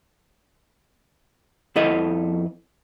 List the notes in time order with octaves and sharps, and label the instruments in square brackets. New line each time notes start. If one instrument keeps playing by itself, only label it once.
[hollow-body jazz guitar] F2 F3 E4 A4 D#5